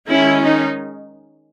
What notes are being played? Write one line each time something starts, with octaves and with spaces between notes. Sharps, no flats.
D#3 G#3 C#4 E4
D#4